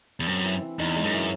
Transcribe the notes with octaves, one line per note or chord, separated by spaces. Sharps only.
E2
F#2 C4
E3
E3
E2 D#4
G#3
F#2
E3